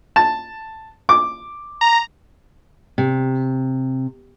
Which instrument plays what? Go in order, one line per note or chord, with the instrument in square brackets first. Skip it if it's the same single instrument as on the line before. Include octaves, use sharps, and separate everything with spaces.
[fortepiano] A5
D6
[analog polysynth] A#5
[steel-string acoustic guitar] C3